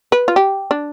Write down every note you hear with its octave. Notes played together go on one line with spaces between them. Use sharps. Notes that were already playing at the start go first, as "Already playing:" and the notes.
B4
F4
G4
D4